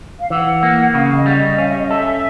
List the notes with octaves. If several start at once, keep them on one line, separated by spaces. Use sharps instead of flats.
F5
E3 F#5
A#3
C#3 F5
D#5
G3
D#5
C#4 F5
E5
D#5
A4 E5